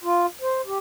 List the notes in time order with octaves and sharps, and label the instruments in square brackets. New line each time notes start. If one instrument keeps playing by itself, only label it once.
[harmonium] F4
C5
G4